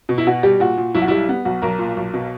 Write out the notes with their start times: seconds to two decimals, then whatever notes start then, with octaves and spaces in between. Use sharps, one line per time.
0.09 B2
0.18 E4
0.27 B2 F#4
0.43 G3 G4
0.60 A#2 F#4
0.77 A#2
0.95 B1 E4
1.02 F#4
1.08 G3 E4
1.29 B3
1.45 B1 F#4
1.62 B1 A#4
1.79 A#2
1.97 B1
2.14 B2